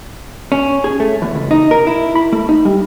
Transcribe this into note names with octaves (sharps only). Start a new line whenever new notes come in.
C#4
G#4
A3
E2
C#2
D#4
A#4
E4
B5
A3
D#4
G3